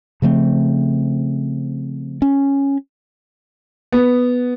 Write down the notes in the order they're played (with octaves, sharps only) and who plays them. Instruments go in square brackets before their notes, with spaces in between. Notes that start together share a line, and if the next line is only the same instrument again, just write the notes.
[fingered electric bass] C#3 F3 A3 C4
C#4
[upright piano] B3